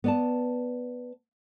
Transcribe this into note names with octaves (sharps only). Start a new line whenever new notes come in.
B3 D5 A5